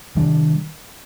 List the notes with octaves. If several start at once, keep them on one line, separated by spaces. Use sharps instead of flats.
C3 D#3 G3 D4